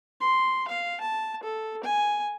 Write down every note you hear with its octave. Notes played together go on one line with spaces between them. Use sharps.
C6
F5
A5
A4
G#5